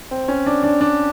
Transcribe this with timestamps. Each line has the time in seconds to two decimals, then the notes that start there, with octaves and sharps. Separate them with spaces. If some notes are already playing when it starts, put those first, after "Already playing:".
0.11 C4
0.28 C#4
0.46 D4
0.63 D4
0.81 D4